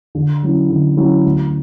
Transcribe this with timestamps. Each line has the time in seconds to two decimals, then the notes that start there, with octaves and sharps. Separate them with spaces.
0.15 D3
0.43 F#3 C#4 E4
0.70 D3
0.97 F#3 C#4 E4
1.25 D2